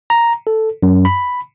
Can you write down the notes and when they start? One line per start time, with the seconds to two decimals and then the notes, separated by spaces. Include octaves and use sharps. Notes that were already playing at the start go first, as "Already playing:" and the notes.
0.10 A#5
0.47 A4
0.83 F#2
1.05 B5